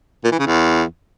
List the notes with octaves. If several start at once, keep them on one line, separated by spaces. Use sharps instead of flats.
A#2
E3
C#3
E2